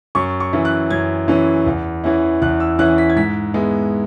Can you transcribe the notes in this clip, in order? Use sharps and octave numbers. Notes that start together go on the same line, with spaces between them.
F#2 C#6
C#6
E3 C#4 E4
F#6
F#2 G#6
E3 C#4 E4
E2
E3 C#4 E4
E2 F#6
E6
E3 C#4 E4 F#6
B6
G#6
G#2 B6
G#3 B3 E4